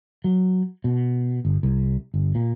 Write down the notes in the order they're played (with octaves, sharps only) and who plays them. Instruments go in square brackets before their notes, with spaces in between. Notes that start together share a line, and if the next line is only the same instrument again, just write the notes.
[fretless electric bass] F#3
B2
G1
C2
G1
A#2